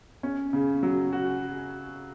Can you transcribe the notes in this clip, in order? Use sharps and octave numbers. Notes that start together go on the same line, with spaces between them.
C#4
C#3
F#3
F#4